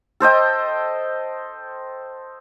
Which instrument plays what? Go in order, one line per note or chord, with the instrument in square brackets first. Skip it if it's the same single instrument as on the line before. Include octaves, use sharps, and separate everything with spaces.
[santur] A4 C5 D#5 G5